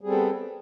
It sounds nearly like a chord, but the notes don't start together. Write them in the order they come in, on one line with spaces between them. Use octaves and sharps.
G3 G#4 C4 A4 B3